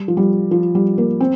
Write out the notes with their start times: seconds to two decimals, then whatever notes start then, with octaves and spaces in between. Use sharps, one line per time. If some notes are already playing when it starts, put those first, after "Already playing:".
Already playing: G3
0.08 F3
0.17 G3
0.51 F3
0.75 G3
0.98 A#3
1.20 C4